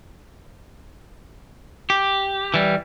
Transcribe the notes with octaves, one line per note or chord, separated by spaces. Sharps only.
G4
E3 G3